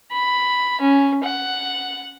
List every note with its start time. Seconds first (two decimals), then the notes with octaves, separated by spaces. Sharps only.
0.11 B5
0.81 C#4
1.23 F#5